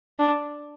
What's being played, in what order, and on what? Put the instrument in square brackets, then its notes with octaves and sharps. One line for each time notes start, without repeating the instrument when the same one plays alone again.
[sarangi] D4